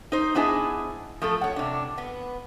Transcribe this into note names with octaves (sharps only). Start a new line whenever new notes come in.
D#4 C5
B3 D4 E4 G#4 D#5 G#5
F3 A3 A4
C#5 F#5
C3 D4
B3